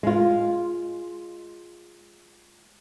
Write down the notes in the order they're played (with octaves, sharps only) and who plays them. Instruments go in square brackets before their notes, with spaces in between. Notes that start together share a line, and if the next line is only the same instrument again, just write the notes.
[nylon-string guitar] G#3 F4